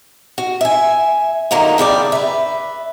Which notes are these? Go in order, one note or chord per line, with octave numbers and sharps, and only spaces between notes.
F#4
E5 G#5
D3 D#3 F#3 A#3 F4
E2 C#3 G3 D5
B4 E5